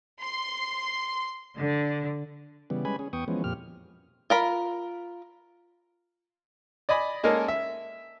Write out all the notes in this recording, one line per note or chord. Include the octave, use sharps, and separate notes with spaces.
C6
D3
C#3 E3 G3 B3
G3 G#3 C#4 B4 G#5 B5
C#4 G#4
E2 B3 G5 C#6 D#6
E3 F3 G#3 B3 C#4
F2 A#2 G4 F6
F4 A#4 B5
D5 D#5 G#5 B5
G#3 A#3 C#4 D#4 A4 A#4
E5